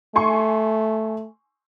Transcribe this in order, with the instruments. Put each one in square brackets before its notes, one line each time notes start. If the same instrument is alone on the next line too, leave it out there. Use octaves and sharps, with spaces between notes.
[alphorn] A3 [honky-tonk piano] G#5 C6 C#6